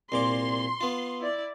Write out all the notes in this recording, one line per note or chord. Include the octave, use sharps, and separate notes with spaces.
C2 A#2 C6 D6
B3 F4
E4 D5